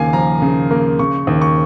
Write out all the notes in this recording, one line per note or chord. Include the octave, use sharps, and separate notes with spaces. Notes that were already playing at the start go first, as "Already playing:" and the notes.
Already playing: D#2 C#3 A#3 F5 G#5
F3 A#5
C#3
A#3
C#3 C#6
D#2
C#6